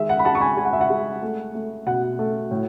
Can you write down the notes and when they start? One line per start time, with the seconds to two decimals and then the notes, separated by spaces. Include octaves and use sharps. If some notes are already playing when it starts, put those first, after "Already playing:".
Already playing: D#3 G#3 E5
0.09 F#5
0.19 B5
0.25 G#3 F#5 A5
0.35 C#6
0.41 G#5 B5
0.57 G#3 G#5
0.65 F#5
0.73 E5
0.81 F#5
0.90 G#3
1.22 A3
1.55 A3
1.86 B2 F#5
2.19 A3
2.51 A2